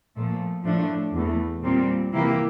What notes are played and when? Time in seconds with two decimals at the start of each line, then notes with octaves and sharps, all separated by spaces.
0.15 A#2 F3 A3
0.64 A2 F3 A3 D4
1.13 E2 E3 A3
1.63 A#2 G3 C4
2.13 C3 E3 A#3 E4 G4